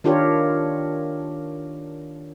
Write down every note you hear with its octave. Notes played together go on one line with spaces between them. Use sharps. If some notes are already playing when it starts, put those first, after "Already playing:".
D#3 D4 F4 G4 A#4 C#5